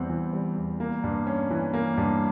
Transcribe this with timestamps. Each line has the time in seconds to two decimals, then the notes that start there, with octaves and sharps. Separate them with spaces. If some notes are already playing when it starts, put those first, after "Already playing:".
Already playing: E2 G3 C4
0.10 E3
0.33 G3
0.56 E2
0.80 A#3
1.04 G2
1.27 C#4
1.51 E3
1.74 A#3
1.97 G2